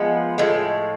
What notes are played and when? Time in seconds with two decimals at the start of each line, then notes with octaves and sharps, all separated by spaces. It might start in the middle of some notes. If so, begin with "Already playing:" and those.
Already playing: F3 G#3 B3
0.38 A2 F3 G#3